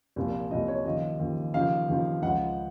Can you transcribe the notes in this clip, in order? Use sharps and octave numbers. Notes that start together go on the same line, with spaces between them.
C2 A#2 F3
C2 A#2 F3 D#5
C#5
D#2 C#3 F3 D#5
D#2 C#3 F3
D#2 C#3 F3 F5
D#2 C#3 F3
C#2 C#3 F3 F#5